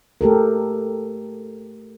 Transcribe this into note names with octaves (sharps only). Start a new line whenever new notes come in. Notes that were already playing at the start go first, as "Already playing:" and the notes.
A3 G4 A4 A#4